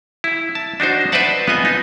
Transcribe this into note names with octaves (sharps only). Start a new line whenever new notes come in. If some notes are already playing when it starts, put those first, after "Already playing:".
E4
A5
D4 D#4 F#4 C5
B4 C5 D5 E5 F#5 A5
B3 F4 D#5 G#5
D#4